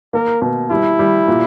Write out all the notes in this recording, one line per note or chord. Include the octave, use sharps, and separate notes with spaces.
A#3 A#4
B2
G3 E4
G3
A#2